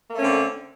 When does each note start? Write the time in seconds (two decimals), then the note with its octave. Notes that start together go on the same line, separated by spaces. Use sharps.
0.10 A#3
0.14 A3
0.17 C#4
0.21 C4
0.24 D3